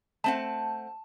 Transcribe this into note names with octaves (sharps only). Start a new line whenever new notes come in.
A3 C4 F#5 A5